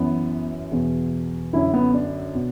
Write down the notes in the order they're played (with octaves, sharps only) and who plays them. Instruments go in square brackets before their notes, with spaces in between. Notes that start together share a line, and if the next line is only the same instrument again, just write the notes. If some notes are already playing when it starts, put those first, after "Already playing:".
Already playing: [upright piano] F#2 E3 B3
E2 B2
F#2 D3 E4
B3
D4
B2